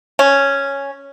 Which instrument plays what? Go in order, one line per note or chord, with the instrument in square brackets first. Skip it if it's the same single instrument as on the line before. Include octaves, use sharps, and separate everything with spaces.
[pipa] C#4